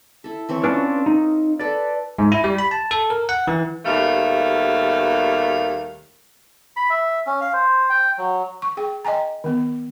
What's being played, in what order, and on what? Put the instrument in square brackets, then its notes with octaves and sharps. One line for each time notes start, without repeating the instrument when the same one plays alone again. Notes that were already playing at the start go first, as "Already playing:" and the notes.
[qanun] E4 A4
E3 C4 C#5
[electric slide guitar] C#4 D4 B4 [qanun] F4
[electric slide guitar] D#4
[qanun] A4 B4 [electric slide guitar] D5
[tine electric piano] G#2
E4
G3
B5
A5
A4
A#4
F#5
E3
[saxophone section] D#2 B2 G3 A3 F5
[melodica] B5
E5
C#4
F5
C5
G5
F#3
[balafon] C#6
G#4 G5
D#5 G5 G#5 A#5
D#3 B3